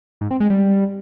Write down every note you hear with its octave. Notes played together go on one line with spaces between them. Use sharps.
G#2
C4
G#3
G3